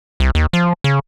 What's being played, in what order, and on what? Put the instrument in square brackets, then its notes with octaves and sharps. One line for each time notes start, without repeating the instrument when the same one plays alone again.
[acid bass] C2
D#2
F3
C#3